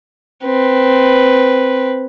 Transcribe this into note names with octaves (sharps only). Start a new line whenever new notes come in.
C4 B4